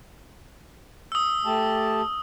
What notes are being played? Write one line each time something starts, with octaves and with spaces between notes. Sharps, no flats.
D#6 E6
A3 G4 A5